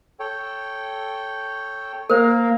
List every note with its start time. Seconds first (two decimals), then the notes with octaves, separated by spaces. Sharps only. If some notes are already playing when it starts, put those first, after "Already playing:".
0.19 A4 C#5 G5
2.10 A#3 A#4 C5